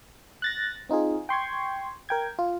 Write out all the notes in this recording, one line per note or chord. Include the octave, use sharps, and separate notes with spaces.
F#6 A6 A#6
C4 D#4 F4 G#4
G5 C6 C#6 G#6
A#4 G5 G#6
F4